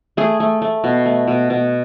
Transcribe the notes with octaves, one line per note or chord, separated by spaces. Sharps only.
A3 G#4
A3
A3
B2
A3
B2
B2